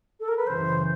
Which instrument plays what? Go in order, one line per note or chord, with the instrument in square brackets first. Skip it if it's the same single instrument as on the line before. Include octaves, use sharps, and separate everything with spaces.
[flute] A4
A#4
B4
[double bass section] F#2 C#3 E3 [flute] C5